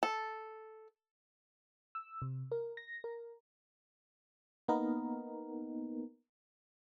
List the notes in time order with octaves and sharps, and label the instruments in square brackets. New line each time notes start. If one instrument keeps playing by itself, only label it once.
[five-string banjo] A4
[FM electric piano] E6
C3
A#4
A#6
A#4
A#3 B3 D#4 A#4